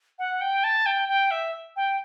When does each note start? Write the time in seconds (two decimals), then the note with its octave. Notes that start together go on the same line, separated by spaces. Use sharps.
0.19 F#5
0.41 G5
0.64 A5
0.86 G5
1.09 G5
1.31 E5
1.76 G5